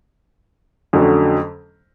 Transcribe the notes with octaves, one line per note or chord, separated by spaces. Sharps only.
F2 D3 F#3 A3 C#4